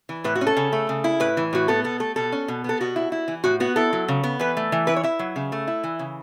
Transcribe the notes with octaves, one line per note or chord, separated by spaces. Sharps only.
E3
A2 B4
F#4
C#4
A4
C#3
A3
C#3
E4
A2 B4
E3
A2 F#4
B3 A4
B2 A4
A3 A4
B2 A4
C#4
B2
B3 A4
B2 F#4
E4
E4
E3
A2 F#4
B3 F#4
E4 A4
F#3
C#3
B3
E3 B4
A3
E3
E4 B4
C#5
E4 E5
F#3
C#3
A3
E4
E3
C#3